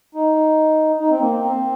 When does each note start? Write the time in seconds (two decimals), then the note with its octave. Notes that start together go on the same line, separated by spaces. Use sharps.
0.15 D#4
1.00 D#4
1.10 C4
1.20 A#3
1.31 C4